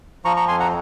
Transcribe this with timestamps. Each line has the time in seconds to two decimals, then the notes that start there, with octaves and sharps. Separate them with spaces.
0.25 F3 A#5 C#6
0.36 A#5 C#6
0.48 F2 G#5 C6
0.60 F#5 A#5